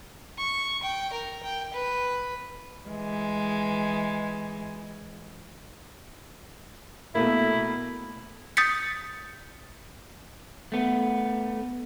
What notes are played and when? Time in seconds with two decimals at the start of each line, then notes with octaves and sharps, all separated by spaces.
0.38 C#6
0.83 G5
1.13 A#4
1.43 G5
1.73 B4
2.86 E3 G#3
7.15 B2 A3 A#3 E4
8.57 D#6 G6 A6 B6 C#7
10.72 A3 B3